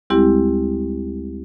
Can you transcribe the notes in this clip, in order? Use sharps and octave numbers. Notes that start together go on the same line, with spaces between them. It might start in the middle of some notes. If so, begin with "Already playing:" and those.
D2 G3 G#3 C4 E4 G4